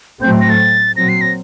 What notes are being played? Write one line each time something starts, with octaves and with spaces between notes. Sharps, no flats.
A2 F#3 A3 C4 G6
A#6
A6
A#2 F#3 C4 A#6
C7
A#6